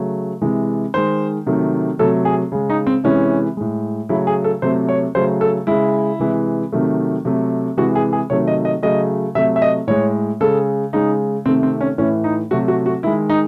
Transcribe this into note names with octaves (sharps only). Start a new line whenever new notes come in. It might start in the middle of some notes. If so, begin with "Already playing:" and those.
Already playing: C#3 F#3 A3
C3 E3 G#3
D#3 G#3 C5
C3 D#3 F#3 A3
C3 F#3 A3 A4
G#4
C#3 G#3
D#4
C4
C3 E3 G#3 C#4
A2 G#3
C#3 F#3 A3 E4
G#4
A4
C3 F#3 A3 C5
C#5
C#3 F#3 A3 C5
A4
C#3 G#3 E4
C3 E3 G#3
C3 D#3 F#3 A3
C3 F#3 A3
C3 E3 G#3 F#4
G#4
G#4
C3 D#3 F#3 A3 C#5
D#5
D#5
C#3 F#3 A3 D#5
C3 F#3 A3 E5
E5
D#5
A2 G#3 C#5
C#3 G#3 A4
C#3 G#3 D#4
C3 D#3 A3 C4
C4
C#4
A2 E3 A3 C#4
D#4
C3 F#3 A3 F#4
F#4
F#4
D#3 G#3 E4
D#4